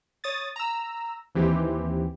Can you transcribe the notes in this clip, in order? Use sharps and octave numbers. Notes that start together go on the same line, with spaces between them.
C#5 D#6 A6
A#5 E6
D#2 E3 C4 G4